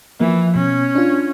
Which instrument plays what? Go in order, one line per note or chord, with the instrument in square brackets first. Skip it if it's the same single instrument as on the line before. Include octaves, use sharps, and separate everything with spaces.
[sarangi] E3 [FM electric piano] F3 A#3
[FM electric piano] B2 [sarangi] C#4
[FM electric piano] D4 F4